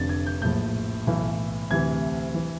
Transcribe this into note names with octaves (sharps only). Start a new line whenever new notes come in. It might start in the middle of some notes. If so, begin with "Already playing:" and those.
Already playing: F1 F2 D3 F3 A6
G#6
G6
A#1 A2 F3 G6
B1 A2 E3
D2 C3 E3 G#6
E3